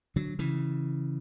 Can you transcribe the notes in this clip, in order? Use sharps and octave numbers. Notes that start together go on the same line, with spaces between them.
D3 F#3
C#3 E3